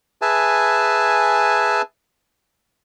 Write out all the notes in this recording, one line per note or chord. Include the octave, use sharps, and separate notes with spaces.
G#4 B4 E5 G#5 A5